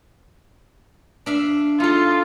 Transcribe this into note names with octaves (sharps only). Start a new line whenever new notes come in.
D4 E5 F5
D#4 F4 A4